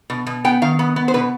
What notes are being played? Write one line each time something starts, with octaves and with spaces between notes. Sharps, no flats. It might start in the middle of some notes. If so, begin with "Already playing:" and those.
B2
B2
B3 G5
D#3 F5
B3
B3
C5
B2 B4